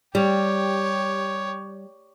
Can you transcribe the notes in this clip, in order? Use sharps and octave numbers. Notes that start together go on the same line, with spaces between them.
G3 G4 C#5